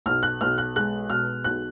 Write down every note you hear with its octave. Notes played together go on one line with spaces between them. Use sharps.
B1 F6
F#6
B1 F6
F#6
G#3 F#6
B2 F6
B1 F#6